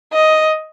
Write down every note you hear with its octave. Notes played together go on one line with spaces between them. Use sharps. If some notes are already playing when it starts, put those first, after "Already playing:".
D#5